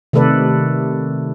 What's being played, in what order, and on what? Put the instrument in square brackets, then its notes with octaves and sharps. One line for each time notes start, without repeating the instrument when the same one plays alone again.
[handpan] C3 D#3 A3 A4 B4 D5